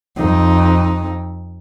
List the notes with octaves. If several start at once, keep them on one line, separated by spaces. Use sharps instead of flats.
F2 D#4